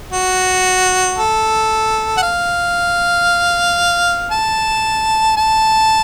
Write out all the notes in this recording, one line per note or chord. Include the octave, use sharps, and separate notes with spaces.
F#4
A4
F#5
F5
A5
A5